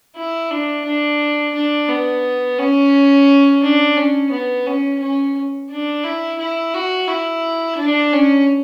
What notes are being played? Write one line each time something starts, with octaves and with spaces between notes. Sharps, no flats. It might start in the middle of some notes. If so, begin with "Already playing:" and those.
E4
D4
D4
D4
B3
C#4
D4
C#4
B3
C#4
C#4
D4
E4
E4
F#4
E4
D4
C#4